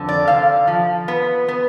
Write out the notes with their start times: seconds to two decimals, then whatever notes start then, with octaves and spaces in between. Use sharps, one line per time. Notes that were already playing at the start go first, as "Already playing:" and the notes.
Already playing: F2 D3
0.09 D5
0.27 C3 F5
0.68 F3
1.08 B3
1.48 B3